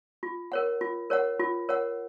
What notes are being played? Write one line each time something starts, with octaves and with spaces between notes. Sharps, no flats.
F4
A#4 C#5 F#5
F4
A#4 C#5 F#5
F4
A#4 C#5 F#5